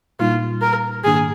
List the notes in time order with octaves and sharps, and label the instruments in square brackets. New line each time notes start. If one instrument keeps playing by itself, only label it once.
[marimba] A#2 G3 A#3 D#4 [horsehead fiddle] F4
[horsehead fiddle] A#4
[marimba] G#2 D#3 A#3 D4 [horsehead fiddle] G#4